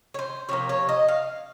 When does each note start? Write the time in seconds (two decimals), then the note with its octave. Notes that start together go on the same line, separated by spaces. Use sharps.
0.14 C#5
0.19 C5
0.49 C3 F3 A#3 C#5
0.69 C#5
0.89 D#5
1.08 F5